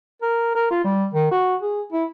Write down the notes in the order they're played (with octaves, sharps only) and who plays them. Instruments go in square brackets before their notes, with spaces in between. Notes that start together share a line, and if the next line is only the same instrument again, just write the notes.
[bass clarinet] A#4
A#4
F4
G3
D#3
F#4
G#4
E4